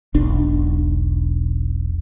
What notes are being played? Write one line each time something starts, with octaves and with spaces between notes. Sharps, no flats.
E1 B1 D4